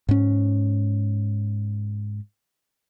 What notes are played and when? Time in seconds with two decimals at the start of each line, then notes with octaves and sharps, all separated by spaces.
0.09 G#2 C#4